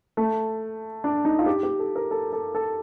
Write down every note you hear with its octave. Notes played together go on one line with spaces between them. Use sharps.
A3
D4
D#4
F4
G4
G4
A4
A#4
A4
A4
A4